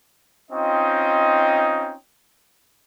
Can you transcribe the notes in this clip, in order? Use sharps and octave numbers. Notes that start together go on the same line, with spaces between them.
C4 C#4 D#4 F4 D#5 G5